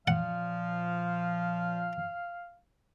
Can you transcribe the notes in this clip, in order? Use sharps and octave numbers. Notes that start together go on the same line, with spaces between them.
A#2 F3 F5 F#5